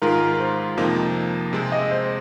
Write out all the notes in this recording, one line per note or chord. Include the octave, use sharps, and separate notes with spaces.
G#2 D#3 G#3 F4 A#4
A#4
C5
F2 C3 F3 A#3 D#4
C3 G#3 C4
D#5
C5